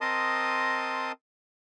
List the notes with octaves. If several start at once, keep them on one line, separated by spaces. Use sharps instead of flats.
C4 A#4 D#5 A5 C6 D#6